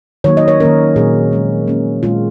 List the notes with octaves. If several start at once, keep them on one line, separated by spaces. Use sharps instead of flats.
D#3 F#3 A#3 C#5
D#5
C#5
D#3 A#3 C#4 A#4
A#2 F#3 C4 G#4
F3 G#3 C#4
D#3 A#3 C#4
A#2 G#3 C4 F4